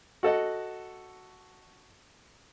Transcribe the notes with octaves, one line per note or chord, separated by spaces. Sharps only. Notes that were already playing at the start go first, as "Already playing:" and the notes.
F#4 A4 D#5 F#5